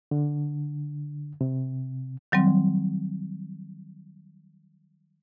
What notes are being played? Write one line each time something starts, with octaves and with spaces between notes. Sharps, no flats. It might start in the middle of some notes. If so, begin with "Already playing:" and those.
D3
C3
D#3 F#3 G3 C4